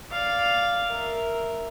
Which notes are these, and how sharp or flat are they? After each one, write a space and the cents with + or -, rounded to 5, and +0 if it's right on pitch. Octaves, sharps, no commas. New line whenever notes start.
D5 -5 F5 +0
A#4 +0 E5 +0